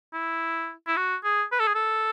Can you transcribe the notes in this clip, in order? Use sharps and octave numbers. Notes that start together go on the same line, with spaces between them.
E4
E4
F#4
G#4
B4
A4
G#4
A4